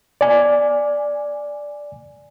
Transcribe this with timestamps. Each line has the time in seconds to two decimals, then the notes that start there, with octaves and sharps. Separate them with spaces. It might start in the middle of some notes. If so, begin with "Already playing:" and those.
0.21 D5 G#5